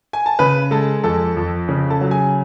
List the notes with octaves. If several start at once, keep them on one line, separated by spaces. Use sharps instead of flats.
G#5
A5
C#3 B4 B5
G#3 A4 A5
F2 A4 A5
F2
C#3
A4 A5
F#3
G#4 G#5